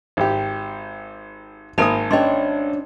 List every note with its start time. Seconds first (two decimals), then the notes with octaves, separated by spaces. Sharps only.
0.17 G#1 G4
1.78 G#1 A#3 G#5 A5 B5 D#6
2.11 C#4 D4 C#5 D#5 C6